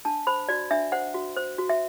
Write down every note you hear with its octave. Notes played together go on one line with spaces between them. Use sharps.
D4 A5
C5 B5
F#4 D5
D4 E5
C5 F#5
F#4
C5
F#4
E5